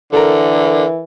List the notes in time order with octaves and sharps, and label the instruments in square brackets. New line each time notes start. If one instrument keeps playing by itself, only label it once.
[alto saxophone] D3 [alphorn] E3 [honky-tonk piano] A4 A#4